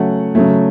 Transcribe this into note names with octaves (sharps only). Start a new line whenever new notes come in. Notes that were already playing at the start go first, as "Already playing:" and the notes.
Already playing: C#3 F#3 A3 F#5
C#3 F#3 A3